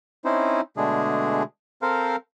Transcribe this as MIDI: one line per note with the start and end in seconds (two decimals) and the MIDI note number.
0.25 0.61 60
0.25 0.61 61
0.25 0.61 63
0.25 0.61 64
0.25 0.61 72
0.77 1.43 47
0.77 1.43 50
0.77 1.43 56
0.77 1.43 57
0.77 1.43 62
0.77 1.43 68
1.82 2.16 60
1.82 2.16 69
1.82 2.16 70
1.82 2.16 72
1.82 2.16 77